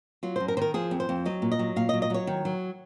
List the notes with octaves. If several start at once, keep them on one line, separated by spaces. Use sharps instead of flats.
F#3 F4
F#2 C5
A#4
D#3 A#4 C5
F3 G#4
F2
C5
F2
F#3 D#5
A#2
D#5
F#3
A#2 F5
D#5
F#3
D#5
F#3 C#5
D#3
F#3